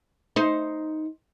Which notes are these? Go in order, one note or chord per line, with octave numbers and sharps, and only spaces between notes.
D#4 C5